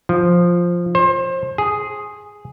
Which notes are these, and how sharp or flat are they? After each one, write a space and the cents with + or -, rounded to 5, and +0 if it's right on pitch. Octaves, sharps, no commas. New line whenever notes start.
F3 +0
C5 +30
G#4 +0